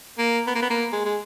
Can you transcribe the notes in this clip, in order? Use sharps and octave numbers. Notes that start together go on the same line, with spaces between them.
A#3
B3
A#3
B3
A#3
G#3
G#3